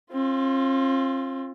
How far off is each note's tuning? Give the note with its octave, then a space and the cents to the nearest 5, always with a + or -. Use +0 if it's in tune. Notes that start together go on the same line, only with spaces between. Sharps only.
C4 +40 F4 +0